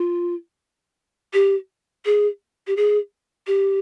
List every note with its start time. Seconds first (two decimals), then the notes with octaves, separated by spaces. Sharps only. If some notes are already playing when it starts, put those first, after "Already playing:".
Already playing: F4
1.33 G4
2.05 G#4
2.67 G4
2.77 G#4
3.47 G4